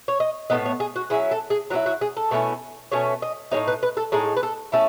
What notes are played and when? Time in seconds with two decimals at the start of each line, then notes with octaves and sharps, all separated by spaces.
0.08 C#5
0.20 D#5
0.50 A2 E3 B3 D#5
0.66 C#5
0.80 G#4
0.96 F#4
1.10 F#3 C#4 E4 G#4
1.31 A4
1.50 G#4
1.70 F#3 F#4
1.73 C#4 E4
1.86 F#4
2.01 G#4
2.17 A4
2.31 B2 A3 C#4 E4
2.92 B2 A3 C#4 C#5
3.22 D#5
3.52 G#3 D#4 C#5
3.56 A2
3.68 B4
3.83 B4
3.97 A4
4.12 A2 G#3 D#4 G#4
4.36 B4
4.43 A4
4.72 A3 C#4 E4 A4